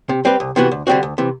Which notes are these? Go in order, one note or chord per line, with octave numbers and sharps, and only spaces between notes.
C3
G3 C4 G4 B4
C2
C3 E3 B3 F#4
D2
D3 G3 C4 F#4
D2
C3 E3